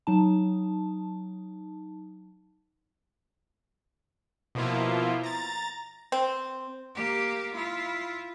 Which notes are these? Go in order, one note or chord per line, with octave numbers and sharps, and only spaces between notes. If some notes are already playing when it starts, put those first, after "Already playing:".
F#3 D#4 A5
B2 F3 A#3 E4 F4
A#5 A6
C4
A#3 G4
E4 F4